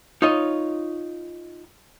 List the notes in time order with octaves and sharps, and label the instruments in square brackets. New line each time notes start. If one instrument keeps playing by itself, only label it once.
[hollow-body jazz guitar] D#4 F4 C#5 D#5